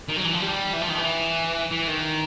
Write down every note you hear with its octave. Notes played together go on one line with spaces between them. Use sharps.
D#3
F#3
E3
F3
G3
E3
F3
D#3
E3
E3
D#3